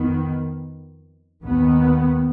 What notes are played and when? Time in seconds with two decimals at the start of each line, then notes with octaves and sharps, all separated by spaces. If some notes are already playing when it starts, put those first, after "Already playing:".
Already playing: F2 D#3 B3
1.44 D#2 D#3 B3